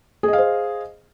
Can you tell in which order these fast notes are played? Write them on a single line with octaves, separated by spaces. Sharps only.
G#4 D#5 F5 C5